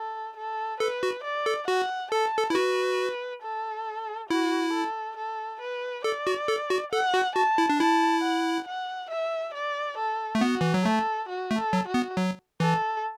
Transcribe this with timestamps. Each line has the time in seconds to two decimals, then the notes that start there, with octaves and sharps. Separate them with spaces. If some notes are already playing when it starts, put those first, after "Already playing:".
Already playing: A4
0.37 A4
0.80 A4 B4
1.03 F#4
1.24 D5
1.46 A4
1.68 F#4 F#5
2.12 A4 A5
2.37 A4
2.50 E4
2.55 F#4 B4
3.42 A4
4.30 E4 F#4
4.73 A4
5.17 A4
5.61 B4
6.04 A4 D5
6.27 F#4
6.48 A4
6.70 F#4
6.92 A4 F#5
7.14 F#4
7.35 F#4 A5
7.58 E4
7.70 D4
7.80 E4 A5
8.23 F#5
8.67 F#5
9.10 E5
9.54 D5
9.98 A4
10.35 A3
10.41 B3 F#4
10.61 E3
10.74 F#3
10.85 A3 A4
11.29 F#4
11.51 A3
11.59 A4
11.73 F#3
11.88 F#4
11.94 B3
12.17 F#3
12.60 E3 A4